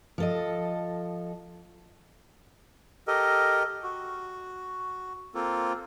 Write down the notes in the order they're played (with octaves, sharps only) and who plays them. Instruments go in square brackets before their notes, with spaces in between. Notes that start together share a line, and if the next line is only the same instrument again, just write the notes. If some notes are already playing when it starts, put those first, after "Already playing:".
[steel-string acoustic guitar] F3 A4 D#5
[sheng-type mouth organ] G4 A4 A#4 D#5
F#4
A#3 C4 F4 A4